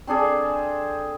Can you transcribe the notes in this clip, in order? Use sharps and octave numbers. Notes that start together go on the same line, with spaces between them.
C4 D4 G#4 A4